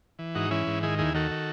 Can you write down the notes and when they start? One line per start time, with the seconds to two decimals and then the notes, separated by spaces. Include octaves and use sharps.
0.19 E3
0.35 G#2 D#4 F#4
0.51 E3 C#4 E4
0.67 G#2
0.83 D#3 E4 G#4
0.99 D#2 E4 G#4
1.14 D#3 F#4 A4
1.31 D#3